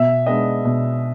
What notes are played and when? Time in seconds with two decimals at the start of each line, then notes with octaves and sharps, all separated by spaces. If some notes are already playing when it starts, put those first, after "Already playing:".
Already playing: B2 E5
0.26 G#3 B3 D4 D#5
0.64 B2